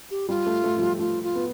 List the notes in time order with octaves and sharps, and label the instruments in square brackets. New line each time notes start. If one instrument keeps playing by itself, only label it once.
[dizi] G4
[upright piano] G3 [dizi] F4
[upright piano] A3
A3
F3
G3
[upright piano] A3 [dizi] F4
[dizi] F4
[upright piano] B3